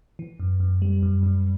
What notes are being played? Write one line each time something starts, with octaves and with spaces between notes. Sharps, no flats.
E3
F#2
F#2
G3
F#2
F#2